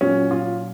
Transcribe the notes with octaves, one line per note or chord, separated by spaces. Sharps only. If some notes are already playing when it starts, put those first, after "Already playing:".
A#2 F#3 C#4
F4